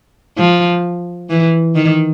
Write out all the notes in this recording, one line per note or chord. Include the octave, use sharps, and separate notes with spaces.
F3
E3
D#3